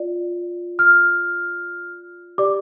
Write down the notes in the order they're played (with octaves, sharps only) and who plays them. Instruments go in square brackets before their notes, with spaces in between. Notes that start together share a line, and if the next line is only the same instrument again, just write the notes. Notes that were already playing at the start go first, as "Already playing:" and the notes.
Already playing: [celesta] F4 D5
F6
G4 D5 D6